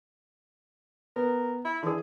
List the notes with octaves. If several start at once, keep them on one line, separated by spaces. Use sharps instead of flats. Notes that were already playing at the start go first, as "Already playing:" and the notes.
B3 A#4
E4
D3 E3 G#4